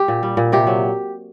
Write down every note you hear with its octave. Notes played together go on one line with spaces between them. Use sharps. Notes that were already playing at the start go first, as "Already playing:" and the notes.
Already playing: G4
A#2
G3
A#2
C3 G4
F#3